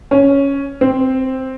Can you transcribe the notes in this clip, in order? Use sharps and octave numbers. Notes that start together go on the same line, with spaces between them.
C#4
C4